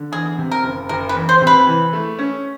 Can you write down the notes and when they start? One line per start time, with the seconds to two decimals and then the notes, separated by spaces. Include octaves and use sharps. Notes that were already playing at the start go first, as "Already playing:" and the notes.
Already playing: D3
0.12 E2 G#4
0.38 C3
0.51 A#4
0.64 F#1
0.89 F#1 A#4
1.09 B4
1.15 E2
1.29 C5
1.41 C3
1.47 B4
1.67 E3
1.93 A3
2.19 C#4